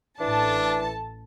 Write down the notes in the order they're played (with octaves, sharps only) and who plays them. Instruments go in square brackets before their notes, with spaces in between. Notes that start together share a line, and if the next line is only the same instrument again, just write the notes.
[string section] A1 A4 A5 [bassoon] E3 [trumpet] D4